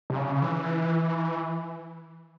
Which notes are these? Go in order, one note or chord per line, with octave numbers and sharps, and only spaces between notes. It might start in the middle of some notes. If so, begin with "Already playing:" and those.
C3
C#3
E3